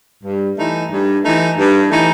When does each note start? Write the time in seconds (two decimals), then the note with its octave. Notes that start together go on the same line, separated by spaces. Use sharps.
0.24 G2
0.58 E3 A3 D#4
0.91 G2
1.24 E3 A3 D#4
1.58 G2
1.91 E3 A3 D#4